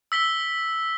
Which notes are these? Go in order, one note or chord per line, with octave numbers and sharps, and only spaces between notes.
E6 B6 G7